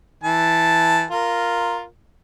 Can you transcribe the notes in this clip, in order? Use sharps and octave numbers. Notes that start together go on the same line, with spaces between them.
E3 A5
F4 A#4